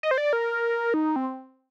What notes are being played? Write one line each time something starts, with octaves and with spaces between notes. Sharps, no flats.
D#5
C5
D5
A#4
D#4
C4